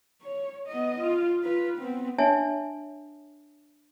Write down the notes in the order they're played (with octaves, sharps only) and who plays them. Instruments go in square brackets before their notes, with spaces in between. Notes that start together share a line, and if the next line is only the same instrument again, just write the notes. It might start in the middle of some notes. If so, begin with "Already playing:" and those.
[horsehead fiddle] C#5
B3 D#5
F4
F4 B4
B3 C4
[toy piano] D4 C#5 E5 G#5 A5